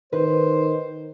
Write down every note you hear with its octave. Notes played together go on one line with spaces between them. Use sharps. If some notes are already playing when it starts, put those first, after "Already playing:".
D#3 B4 C5